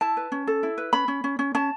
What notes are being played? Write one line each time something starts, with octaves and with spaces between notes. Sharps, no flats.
E4 A5
B4
C#4
A4
E4
B4
C#4 B5
C#4
C#4
C#4
C#4 A5